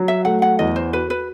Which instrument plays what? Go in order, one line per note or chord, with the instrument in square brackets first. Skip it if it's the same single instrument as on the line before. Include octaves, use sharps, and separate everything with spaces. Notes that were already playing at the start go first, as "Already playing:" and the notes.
Already playing: [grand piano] F#3 F#4
[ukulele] E5
[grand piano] A3 [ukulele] F#5
[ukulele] F#5
[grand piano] E2 [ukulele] D#5
[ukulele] C5
[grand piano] F#4 [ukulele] B4
[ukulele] B4